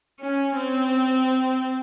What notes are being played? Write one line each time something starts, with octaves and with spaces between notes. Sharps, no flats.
C#4
C4